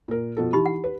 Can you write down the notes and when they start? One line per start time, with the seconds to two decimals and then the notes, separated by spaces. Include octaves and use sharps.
0.08 A#2 A#4
0.37 B2 F3 A4
0.53 E3 D#4 G4 B5
0.66 F#5
0.84 B4